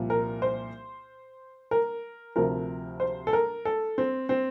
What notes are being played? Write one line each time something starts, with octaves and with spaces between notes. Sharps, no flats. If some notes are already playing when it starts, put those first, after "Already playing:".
Already playing: C2 A#2 F3
A#4
C5
A#4
D2 C3 F3 A#4
C5
A4
A#4
A4
C4
C4